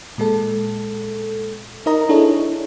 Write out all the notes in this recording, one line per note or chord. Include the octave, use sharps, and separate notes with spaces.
A#2 G#3 A4
D#4 A#4 D#5 A#5
D4 E4 G#4 A4 C#5